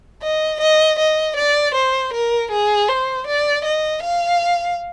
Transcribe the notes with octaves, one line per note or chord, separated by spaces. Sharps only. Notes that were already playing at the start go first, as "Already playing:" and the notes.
D#5
D#5
D#5
D5
C5
A#4
G#4
C5
D5
D#5
F5